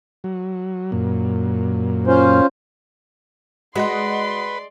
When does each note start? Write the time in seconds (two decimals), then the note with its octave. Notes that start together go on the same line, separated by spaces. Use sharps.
0.24 F#3
0.92 F#2 A#2
2.07 C#4 F4 C5
3.76 G#3 F#4 B4 D5 D#5 F#5 C6